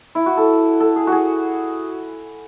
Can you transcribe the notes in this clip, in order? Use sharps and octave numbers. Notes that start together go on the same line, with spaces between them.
E4
F#4
A4
A4
G#4
F#4 G#4